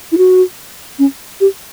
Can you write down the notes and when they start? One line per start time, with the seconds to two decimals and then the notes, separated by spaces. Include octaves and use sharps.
0.12 E4
0.18 F#4
0.99 C#4
1.41 G4